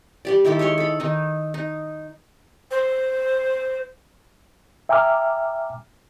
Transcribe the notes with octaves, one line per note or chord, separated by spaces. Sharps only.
G3 G4 D5
D#3 E4 G4 A4
G#3 C#5 C6 C#6
A4 B5
D#3 D#4
D#4
C5
E5 G5 G#5 A#5 D6 F6